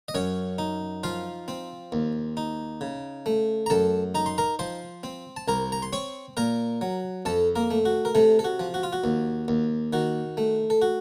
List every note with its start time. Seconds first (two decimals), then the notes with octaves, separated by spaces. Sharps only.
0.08 D#5
0.15 F#2 C#4 C#5
0.58 D#4
1.03 F3 F4 F5
1.48 C4
1.92 D#2
2.37 D#4
2.81 C#3
3.26 A3
3.66 A#5
3.70 F#2 A4 A5
4.15 D#4 A#5
4.26 C6
4.38 A#4 A#5
4.59 F3 C5 C6
5.03 C4
5.36 A5
5.48 C2 A#4 A#5
5.72 A#5
5.82 C6
5.93 C4 C#5 C#6
6.37 A#2 A#4 A#5
6.81 F#3
7.25 F2 A4 A5
7.56 A#3 A#4
7.71 A3
7.85 F#4
8.05 A#4
8.15 C3 A3 A4
8.39 A4
8.44 F#4
8.60 F3
8.74 F#4
8.83 F4
8.93 F#4
9.04 D#2
9.48 D#2
9.93 D#3 F#4
10.37 A3
10.70 A4
10.82 F#4